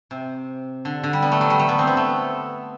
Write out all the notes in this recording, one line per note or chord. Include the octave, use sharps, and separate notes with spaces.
C3
D3
D3
G3
B3
A3
F#3
G3
A3
B3
C4
B3
A3